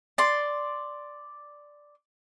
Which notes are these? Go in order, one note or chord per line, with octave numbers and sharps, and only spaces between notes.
D5 C6